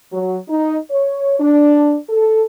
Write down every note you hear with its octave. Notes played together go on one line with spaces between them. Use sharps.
F#3
D#4
C#5
D4
A4